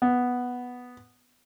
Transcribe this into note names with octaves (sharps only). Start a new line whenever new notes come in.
B3